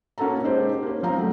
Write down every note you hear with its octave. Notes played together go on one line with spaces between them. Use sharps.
A#3 C#4 F#4 A4 A5 A#5
G#3 D#4 G4 C5
A#3 C#4
F3 C4 F5 A#5
F#3 A3